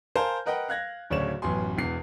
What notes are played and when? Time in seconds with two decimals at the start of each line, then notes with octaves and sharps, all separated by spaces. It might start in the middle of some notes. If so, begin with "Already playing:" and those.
0.15 A#4 C5 F5 G#5 A5
0.46 A#4 B4 D#5 F#5 G5
0.69 F5 F#6 G#6 A#6
1.10 D1 D2 C#3 C#5 D5 E7
1.42 A1 F#2 B3 G#5 C6
1.77 E1 E2 C7